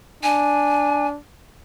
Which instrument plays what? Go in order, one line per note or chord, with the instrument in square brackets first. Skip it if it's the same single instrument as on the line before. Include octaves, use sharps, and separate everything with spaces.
[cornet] D4 [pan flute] G#5